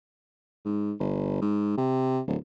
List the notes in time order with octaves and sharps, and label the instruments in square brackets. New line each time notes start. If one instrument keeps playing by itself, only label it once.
[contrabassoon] G#2
G1
G#2
C3
D1